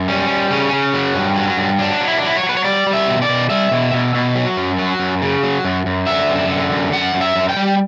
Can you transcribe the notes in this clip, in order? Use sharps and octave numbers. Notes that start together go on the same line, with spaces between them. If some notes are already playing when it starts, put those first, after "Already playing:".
Already playing: F#2
G3 C#4
G3
C#3 C#4
C#3
F#3
G2
F#3
G2
F#3 D4
F#3
E4
D4
F#3 E4
C#5
F#3
B4
C#5
G3 D5
G3
E5
B2
D5
B2
G3 E5
B2
B2
B2
F#3
F#2
F#3
F#2
C#3
F#3
F#2
F#2
D3 E5
F#2
D3
F#2
F#2 F#5
F#2
E5
F#2
G5
G3